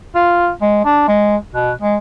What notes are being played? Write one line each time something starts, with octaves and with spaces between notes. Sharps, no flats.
F4
G#3
D4
G#3
B2
G#3